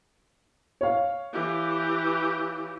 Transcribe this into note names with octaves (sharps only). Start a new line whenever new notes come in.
C#5 F5
E3 G4